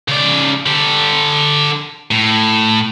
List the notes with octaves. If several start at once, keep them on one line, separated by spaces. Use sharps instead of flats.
C#3 D5
D3 G4
A2